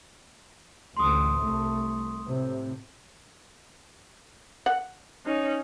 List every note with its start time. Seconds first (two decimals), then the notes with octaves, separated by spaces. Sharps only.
0.97 A1 D2 C6 D#6
1.42 C2 A3
2.25 A2 C3
4.66 F#5
5.25 C#4 D#4